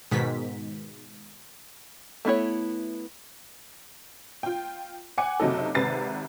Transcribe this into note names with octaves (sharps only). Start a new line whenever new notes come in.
G#2 B2 D#3 B6
A3 B3 E4 C#5
F4 G5
F#5 G#5 D6 C#7
F#1 C3 F#3 D#4 A4
G#1 C3 B4 A6 C7